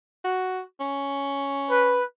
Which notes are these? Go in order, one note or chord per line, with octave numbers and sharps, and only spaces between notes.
F#4
C#4
B4